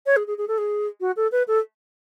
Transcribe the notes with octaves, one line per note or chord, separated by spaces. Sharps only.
C#5
G#4
G#4
G#4
A4
G#4
F#4
A4
B4
A4